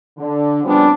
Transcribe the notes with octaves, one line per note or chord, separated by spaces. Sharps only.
D3
C#3 F3 G3 B3 C4 D4